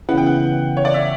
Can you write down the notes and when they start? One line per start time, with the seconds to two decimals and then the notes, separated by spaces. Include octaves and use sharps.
0.09 C#3 E3 B3 F#5
0.18 G5
0.26 F#5
0.77 C#5
0.85 D5
0.94 E5